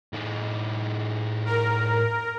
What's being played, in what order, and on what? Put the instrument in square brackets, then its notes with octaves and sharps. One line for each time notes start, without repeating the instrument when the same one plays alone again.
[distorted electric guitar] A2 D#4
[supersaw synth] A#4